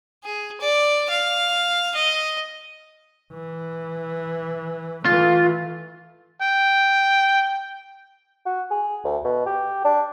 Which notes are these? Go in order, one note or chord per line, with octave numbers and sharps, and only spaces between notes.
G#4
D5
F5
D#5
E3
E3 A3 F4
G5
F#4
G#4
D2
B2
G4
D4